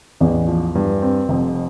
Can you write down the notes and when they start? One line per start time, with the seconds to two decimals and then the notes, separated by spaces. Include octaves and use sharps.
0.21 A1 E2
0.48 F3
0.75 G2
1.02 C4
1.29 F1 F2